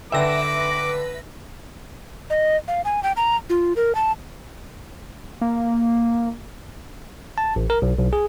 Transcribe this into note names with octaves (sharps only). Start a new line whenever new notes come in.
D3 B4 E5 G5 D6 A#6
D#5
F5
G#5
G5
A#5
F4
A#4
A5
A#3
A5
A1
A#4
B1
B1
G#4